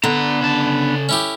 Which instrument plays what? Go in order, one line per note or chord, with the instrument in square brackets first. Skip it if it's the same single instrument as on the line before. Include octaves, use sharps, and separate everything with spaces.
[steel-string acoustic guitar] D3 [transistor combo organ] B3 [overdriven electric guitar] D5 A#5
[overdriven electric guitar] C#3 A5
[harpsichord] C#4 E4 G4